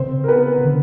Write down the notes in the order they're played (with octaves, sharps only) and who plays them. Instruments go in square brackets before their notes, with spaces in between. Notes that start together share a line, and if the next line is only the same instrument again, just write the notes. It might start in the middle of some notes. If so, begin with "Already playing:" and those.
Already playing: [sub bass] C#3 [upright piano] C4 C5
[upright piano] A#4
B3 B4
[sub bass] D3